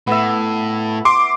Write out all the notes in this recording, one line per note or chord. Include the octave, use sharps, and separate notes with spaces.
A2 B3 E5
C6 D6